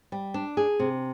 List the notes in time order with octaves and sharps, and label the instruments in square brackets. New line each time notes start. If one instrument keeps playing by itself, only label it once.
[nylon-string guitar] G3
D4
G#4
C3